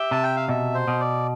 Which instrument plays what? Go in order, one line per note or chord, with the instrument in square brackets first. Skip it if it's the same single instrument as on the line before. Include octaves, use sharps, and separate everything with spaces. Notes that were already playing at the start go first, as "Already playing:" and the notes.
Already playing: [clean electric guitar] G4 [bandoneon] E5
[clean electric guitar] C3 [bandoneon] A5
[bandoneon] G5
F5
[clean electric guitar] B2 [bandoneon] E5
[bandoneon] C5
[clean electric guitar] B2
[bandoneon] D5